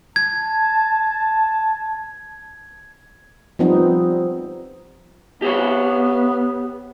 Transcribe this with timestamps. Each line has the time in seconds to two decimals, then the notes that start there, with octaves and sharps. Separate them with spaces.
0.16 A5 G#6
3.59 F3 G3 B3 C4 D#4
5.42 B3 G4 C5 C#5